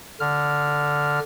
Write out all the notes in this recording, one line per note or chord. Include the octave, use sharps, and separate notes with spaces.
D3 F6